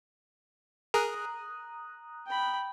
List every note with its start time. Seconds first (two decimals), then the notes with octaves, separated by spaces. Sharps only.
0.94 G#4 A#4 A#5 D#6 F#6
2.26 G5 B5